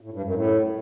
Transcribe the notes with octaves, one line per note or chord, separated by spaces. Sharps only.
A2
G2
F#2
A2